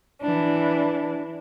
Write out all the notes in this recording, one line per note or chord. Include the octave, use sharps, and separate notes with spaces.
E3 D4